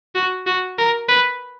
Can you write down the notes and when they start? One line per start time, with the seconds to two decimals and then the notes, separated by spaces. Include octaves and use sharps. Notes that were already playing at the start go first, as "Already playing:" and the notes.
0.15 F#4
0.46 F#4
0.78 A#4
1.09 B4